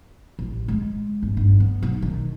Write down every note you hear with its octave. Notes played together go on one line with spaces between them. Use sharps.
A1
G#3
G#1
G1
B3
B1
D#3